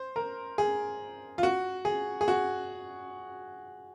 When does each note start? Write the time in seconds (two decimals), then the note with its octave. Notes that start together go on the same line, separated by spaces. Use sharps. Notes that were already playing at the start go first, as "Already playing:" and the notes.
Already playing: C5
0.16 A#4
0.58 G#4
1.38 F4
1.43 F#4
1.85 G#4
2.21 G#4
2.28 F#4